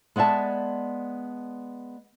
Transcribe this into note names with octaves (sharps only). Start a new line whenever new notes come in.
G#3 B3 D5 E5 A5